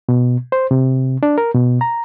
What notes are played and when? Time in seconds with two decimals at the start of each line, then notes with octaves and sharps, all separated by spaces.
0.09 B2
0.52 C5
0.71 C3
1.23 D4
1.38 A#4
1.55 B2
1.81 A#5